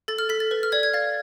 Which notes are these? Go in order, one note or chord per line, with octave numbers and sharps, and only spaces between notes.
A4 A6
F6
A4 B6
A6
B4
F6
D5 G#6
G#6
F5 A6